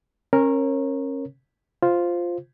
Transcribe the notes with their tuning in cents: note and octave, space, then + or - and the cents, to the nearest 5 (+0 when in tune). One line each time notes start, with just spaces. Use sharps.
C#4 -30 A#4 +0 C#5 -25
F4 +0 C5 +0